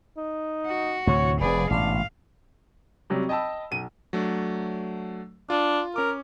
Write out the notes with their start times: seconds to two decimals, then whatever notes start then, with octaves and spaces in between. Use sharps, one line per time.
0.17 D#4
0.66 F#4
1.07 D2 A2 C3 C#5
1.41 F1 C3 G#4 B4 D5
1.71 A1 G#2 B2 D4 F5
3.10 C3 F#3 G3
3.29 D#5 G5 A5 B5 E6
3.71 B1 D#7
4.13 F#3 A3 D4
5.50 D4 F4
5.96 C#4 A#4 D6